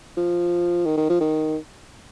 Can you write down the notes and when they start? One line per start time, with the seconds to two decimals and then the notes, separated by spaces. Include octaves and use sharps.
0.17 F3
0.86 D#3
0.97 D#3
1.09 F3
1.20 D#3